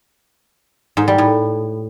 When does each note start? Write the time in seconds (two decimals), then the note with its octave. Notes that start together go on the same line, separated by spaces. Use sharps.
0.97 G#2
1.08 G3
1.18 A2